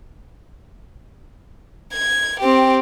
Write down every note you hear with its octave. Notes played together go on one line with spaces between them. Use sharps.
G#6
C4 G4